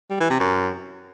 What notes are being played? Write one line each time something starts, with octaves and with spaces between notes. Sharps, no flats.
G3
E3
C3
F#2